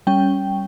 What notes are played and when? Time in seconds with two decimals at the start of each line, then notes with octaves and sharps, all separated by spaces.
0.07 G3 C#4 G5